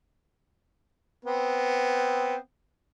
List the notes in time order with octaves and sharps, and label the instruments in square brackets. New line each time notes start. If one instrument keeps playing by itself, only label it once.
[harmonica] B3 C4